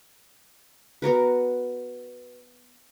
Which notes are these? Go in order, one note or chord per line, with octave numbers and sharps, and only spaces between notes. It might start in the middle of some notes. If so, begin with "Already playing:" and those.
B3 F#4 A#4 B4